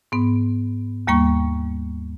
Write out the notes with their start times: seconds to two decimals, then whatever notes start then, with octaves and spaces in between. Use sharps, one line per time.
0.12 G#2 B3
1.07 D#2 G3 A#3 G5 C#6